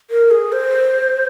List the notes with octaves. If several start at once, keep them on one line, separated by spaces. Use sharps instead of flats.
A#4
G#4
C5